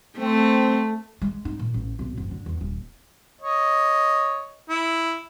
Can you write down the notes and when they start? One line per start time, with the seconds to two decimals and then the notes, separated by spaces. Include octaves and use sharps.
0.18 A3 C4
1.22 G#3
1.45 D#4
1.59 A#2
1.74 A1
1.99 B1
2.17 F#1
2.31 D3
2.46 E2
2.61 D#1
3.41 C#5 D#5
4.69 E4